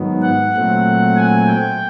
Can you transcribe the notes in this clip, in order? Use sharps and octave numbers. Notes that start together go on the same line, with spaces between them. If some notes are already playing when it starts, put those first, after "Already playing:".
Already playing: G#2 D#3 F#3 B3
F#5
A#2 F#3 A3 C4
G#5
G5